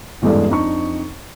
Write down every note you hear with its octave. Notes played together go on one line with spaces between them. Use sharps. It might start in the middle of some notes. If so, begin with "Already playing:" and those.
A1 E2 G2 G#3 A4 D5
F2 D4 D#4 C#6